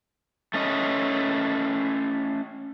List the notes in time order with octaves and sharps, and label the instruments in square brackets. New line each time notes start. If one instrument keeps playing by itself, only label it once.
[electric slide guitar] A3 C#4 D#5